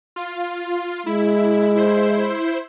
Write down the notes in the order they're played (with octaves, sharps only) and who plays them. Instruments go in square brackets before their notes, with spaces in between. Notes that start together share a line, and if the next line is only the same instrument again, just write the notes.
[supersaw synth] F4
[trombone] G#3 [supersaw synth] E4
[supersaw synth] E4 C5